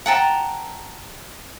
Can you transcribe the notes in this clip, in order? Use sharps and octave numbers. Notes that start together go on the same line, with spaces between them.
F#5 G5 A5 A#5